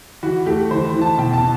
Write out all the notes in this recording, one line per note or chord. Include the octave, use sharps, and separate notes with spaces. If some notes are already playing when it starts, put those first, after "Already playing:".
E3 F#4
A3 G4
E3 C5
E3
A5
B2 G5
A5
B2